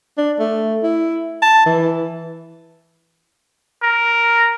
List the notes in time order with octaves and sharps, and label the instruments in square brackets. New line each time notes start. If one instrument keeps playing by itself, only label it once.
[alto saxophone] D4
A3
E4
A5
E3
[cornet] A#4